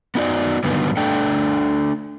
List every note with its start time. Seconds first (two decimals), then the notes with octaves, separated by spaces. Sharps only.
0.15 B3 D#4 F#4 C#5 D5
0.64 G2 D3 D#3 F#3 B3
0.97 A3 D4 A4 D5 G5